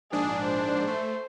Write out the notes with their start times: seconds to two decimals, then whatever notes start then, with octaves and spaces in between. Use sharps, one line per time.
0.12 A#1 G#2 D4 G#4
0.45 C5
0.87 A3